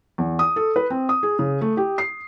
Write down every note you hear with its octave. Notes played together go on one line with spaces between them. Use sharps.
E2
D#6
A4
B4
C4
D#6
G#4
C#3
A3
G4
C7